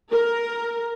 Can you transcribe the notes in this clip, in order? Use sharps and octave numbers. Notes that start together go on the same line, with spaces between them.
A#4